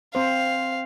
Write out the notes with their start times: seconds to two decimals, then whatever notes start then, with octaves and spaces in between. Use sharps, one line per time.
0.15 C4 C5 F5